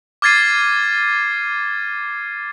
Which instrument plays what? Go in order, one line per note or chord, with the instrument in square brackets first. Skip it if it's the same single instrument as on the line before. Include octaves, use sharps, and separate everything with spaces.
[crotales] D6 F6 G#6 A6 C7 D#7